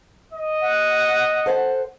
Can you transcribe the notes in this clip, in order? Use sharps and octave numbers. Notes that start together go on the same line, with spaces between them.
D#5
F#5
A4 C5 F#5